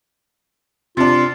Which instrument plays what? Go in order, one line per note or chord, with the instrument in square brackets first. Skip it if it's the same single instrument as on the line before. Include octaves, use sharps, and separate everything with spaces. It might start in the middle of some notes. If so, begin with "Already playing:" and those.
[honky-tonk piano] C3 D4 [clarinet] F4